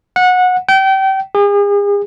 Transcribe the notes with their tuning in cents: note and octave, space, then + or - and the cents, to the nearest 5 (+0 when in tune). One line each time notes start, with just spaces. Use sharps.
F#5 -20
G5 -30
G#4 -40